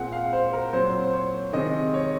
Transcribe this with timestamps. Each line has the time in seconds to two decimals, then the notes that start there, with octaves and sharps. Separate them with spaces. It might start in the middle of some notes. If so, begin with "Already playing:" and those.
Already playing: A#2 G#3 C4 F#5
0.12 F5
0.33 C5
0.53 A#4
0.73 A#2 F#3 C4 C5
1.04 C5
1.13 C#5
1.53 C3 D#3 G#3 C4 D#5
1.94 C#5